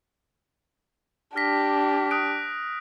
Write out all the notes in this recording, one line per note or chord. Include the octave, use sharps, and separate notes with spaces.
D4 G4 F6 A#6 B6
D#6 F#6 D7